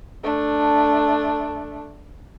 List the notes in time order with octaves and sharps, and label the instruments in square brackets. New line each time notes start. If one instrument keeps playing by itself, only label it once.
[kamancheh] A3 D4